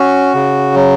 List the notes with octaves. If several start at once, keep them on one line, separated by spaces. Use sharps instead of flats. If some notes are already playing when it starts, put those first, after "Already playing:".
Already playing: C#4 F#4
C#3
F#3